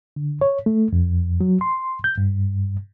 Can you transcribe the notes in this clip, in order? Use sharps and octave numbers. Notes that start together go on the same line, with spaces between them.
D3
C#5
A3
F2
F#3
C6
G6
G2